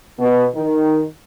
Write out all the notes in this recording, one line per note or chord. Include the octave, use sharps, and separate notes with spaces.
B2
D#3